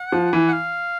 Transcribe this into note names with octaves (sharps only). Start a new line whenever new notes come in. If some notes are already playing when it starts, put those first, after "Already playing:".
Already playing: F#5
F3
E3
F#5
F5